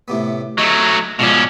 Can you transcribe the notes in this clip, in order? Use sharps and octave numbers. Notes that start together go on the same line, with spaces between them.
A2 C3 B3
F#3 A3 D#4
G#2 B2 F3 C#4 D4